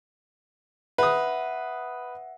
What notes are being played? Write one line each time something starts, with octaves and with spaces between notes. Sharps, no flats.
B4 E5 F#5 D#6